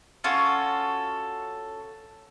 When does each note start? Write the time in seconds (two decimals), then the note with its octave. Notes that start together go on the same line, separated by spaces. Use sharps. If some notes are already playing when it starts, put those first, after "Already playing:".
0.24 C#4 F4 F#4 A4